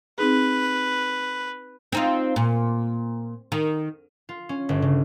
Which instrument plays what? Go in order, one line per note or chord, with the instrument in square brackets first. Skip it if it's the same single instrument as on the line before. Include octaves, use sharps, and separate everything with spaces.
[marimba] C4 D#4 G#4 [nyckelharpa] B4
[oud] C4 D#4 F4
A#2
D#3
[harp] F4
C#4
G1
C#3